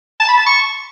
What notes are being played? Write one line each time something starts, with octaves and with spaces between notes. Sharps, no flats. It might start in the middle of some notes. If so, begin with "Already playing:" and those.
A5
B5
A5
C#6